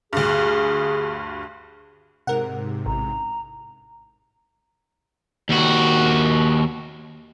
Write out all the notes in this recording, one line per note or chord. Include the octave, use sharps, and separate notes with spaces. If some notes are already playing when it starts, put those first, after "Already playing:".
D2 G2 G#4
G#2 C3 A#4 F#5
A1 A#5
D#2 F#4